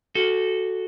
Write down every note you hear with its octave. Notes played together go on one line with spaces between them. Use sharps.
F#4 A4